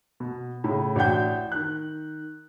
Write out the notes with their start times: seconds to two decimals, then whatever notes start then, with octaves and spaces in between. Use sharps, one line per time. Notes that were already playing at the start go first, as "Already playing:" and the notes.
0.20 B2
0.64 A2 C#3
0.96 A1 D4 F#4 G5 G6
1.52 D#3 F#6